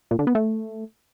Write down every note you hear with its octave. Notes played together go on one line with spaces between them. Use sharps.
A#2
D3
B3
A3